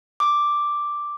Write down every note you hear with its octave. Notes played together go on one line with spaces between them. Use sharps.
D6